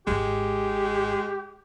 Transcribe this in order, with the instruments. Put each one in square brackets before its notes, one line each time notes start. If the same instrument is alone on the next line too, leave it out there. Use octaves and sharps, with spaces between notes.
[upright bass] G#1 G#2 [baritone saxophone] G#3 [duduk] G4